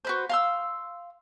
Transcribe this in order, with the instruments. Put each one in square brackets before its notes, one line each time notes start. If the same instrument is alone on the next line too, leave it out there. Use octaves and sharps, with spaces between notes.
[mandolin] F#4 B4 C5
F5 C6 E6